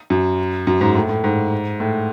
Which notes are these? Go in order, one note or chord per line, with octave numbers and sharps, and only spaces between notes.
F#2
F#2
G#2
A2
A2
G#2
A2